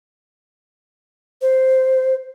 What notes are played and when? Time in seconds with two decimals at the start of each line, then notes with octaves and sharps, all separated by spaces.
1.41 C5